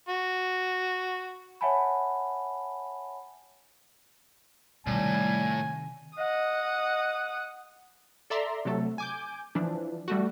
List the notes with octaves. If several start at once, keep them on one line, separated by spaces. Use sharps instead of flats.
F#4
C#5 E5 F#5 G#5 A5 B5
A2 C3 D#3 G3 G#5
D#5 F#5 D#6
A4 D5 E5 A#5 C6
C3 F#3 A3 A4
G#5 D6 G6
E3 F3 D4
G3 A3 F#4